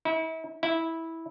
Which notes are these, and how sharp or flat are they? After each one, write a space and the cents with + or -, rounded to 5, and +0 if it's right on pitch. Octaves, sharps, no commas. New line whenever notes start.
E4 -35
E4 -10